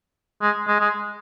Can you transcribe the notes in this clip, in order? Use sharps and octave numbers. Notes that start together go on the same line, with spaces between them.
G#3
G#3
G#3